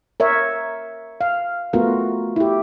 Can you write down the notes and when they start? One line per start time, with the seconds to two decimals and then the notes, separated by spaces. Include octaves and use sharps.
0.20 A#4 C#5 E5
1.21 F5
1.73 A3 B3 F4 F#4 A#4
2.36 E4 G4